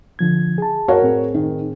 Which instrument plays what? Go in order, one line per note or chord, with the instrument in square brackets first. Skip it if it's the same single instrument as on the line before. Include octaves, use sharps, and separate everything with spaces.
[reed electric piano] D3 F3 G#6
G#4 A5
[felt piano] F#4 A#4 C#5
[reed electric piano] A2 C4 G#4
[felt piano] D#3